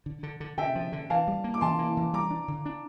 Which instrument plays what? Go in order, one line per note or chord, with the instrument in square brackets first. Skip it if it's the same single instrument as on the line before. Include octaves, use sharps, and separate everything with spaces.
[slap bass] D3
D3
D3
[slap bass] D3 [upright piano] E5 G5
[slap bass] F3
D3
[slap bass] E3 [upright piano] F5 A5
[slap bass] G3
A#3
[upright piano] D6
[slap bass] E3 [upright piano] A5 C6
[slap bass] A#3
E3
[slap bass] G3 [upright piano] A#5 D6
[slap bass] D4
D3
D4